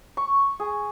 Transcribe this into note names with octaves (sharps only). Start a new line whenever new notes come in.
C#6
G#4